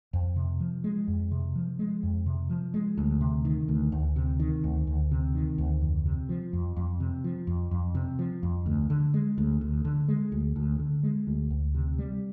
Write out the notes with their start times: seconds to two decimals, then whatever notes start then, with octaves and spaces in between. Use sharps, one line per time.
0.13 F2
0.36 C3
0.60 F3
0.84 G#3
1.08 F2
1.32 C3
1.55 F3
1.79 G#3
2.03 F2
2.26 C3
2.50 F3
2.74 G#3
2.97 D2
3.21 C3
3.45 D#3
3.68 D2
3.92 D2
4.16 C3
4.40 D#3
4.64 D2
4.87 D2
5.11 C3
5.34 D#3
5.58 D2
5.82 F2
6.06 C3
6.29 F3
6.53 F2
6.77 F2
7.00 C3
7.24 F3
7.47 F2
7.71 F2
7.95 C3
8.19 F3
8.43 F2
8.66 D2
8.90 D3
9.14 G#3
9.38 D2
9.61 D2
9.85 D3
10.08 G#3
10.32 D2
10.56 D2
10.79 D3
11.03 G#3
11.27 D2
11.50 D2
11.75 C3
11.98 G3